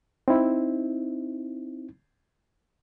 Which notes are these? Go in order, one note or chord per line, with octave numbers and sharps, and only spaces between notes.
C4 D#4 E4